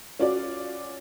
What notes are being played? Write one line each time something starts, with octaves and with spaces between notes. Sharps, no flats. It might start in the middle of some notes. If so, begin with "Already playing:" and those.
C#4 F4 F#4 D5